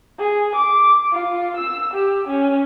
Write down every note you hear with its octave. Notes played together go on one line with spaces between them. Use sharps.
G#4
D6
F4
E6
G4
C#4